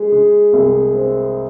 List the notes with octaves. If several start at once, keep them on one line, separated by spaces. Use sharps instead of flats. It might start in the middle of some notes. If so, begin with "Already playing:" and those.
Already playing: G#3 G#4
G#3
C2
C4